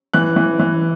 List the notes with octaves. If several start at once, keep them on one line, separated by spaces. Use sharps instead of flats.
E3 F#6
E3
E3